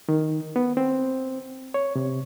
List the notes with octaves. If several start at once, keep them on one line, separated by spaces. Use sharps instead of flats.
D#3
B3
C4
C#5
C3